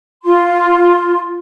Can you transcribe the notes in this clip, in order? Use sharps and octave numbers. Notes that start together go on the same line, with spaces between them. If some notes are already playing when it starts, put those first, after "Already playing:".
F4 C6